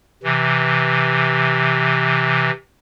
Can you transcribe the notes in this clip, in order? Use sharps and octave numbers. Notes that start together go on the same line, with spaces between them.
C3 E3